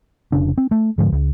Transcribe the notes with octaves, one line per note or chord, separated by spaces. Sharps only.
F1 C#3 D4
C4
A3
G#2 D3 F3 G#3
C#2